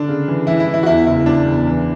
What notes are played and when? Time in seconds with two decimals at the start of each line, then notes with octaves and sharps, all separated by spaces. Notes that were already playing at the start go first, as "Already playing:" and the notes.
Already playing: D3 D4
0.08 C#3
0.28 E3
0.47 E3 E4
0.60 E4
0.67 E3
0.74 E4
0.83 F#4
0.86 E2 E4
1.07 F#1 E4
1.26 F#1 D4
1.46 E2
1.67 E3